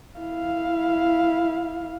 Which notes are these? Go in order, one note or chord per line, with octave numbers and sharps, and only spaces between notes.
E4 F5